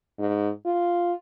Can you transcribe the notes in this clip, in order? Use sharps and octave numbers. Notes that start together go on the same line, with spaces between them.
G#2
F4